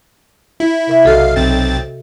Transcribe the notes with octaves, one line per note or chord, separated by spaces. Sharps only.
E4
C3 A#4 E5
B1 F#4 A4 D#5 F5
B1 C4 A6